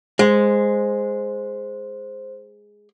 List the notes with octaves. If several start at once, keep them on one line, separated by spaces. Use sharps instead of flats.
G#3 C5